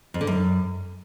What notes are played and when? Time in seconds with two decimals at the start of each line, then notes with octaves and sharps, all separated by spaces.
0.14 F2
0.21 D3
0.27 F#2